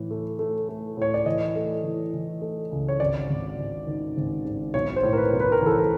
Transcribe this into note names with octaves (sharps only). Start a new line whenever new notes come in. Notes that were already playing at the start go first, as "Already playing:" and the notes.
Already playing: A2 E3
A3
A3
A3
A2 C#5
D5
E3 D#5
A3
E3
E3
A3
C#2
C#5
G#1 D5
G#1
G#1
D#3
G#1
G#1
B1 C#5
C5
A2
A#4
B4
B1
B4
A#4
E3 A4
A#4